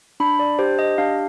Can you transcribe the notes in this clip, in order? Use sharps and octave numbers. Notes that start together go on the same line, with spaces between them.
D4 B5
D5
G4 C5
D#5
D4 F5